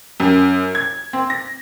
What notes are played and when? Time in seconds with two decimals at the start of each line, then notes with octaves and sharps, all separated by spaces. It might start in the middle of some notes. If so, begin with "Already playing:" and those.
0.20 F#2
0.75 G#6
1.13 C4
1.30 A#6